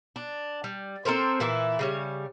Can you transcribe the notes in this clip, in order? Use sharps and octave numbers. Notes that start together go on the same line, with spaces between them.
D4
G3
C4 A4 A#4 C5
A#2 E3 E4
C#3 G3 C#5